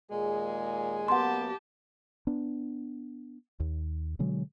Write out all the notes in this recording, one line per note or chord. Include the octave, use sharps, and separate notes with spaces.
D#2 A#2 G#3 G#4
F#2 A#3 B3 G4 F#5 A5 C6
B3 D4
D#2
B2 D3 F#3 G#3